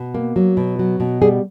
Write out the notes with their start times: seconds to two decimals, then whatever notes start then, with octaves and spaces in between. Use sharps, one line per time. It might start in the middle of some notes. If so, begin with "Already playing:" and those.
Already playing: B2
0.14 A#3
0.36 F#3
0.57 B2
0.79 F#3
1.00 B2
1.22 G3 G#4